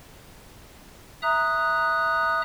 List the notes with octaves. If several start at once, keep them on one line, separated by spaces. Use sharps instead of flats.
E5 A#5 D#6 F#6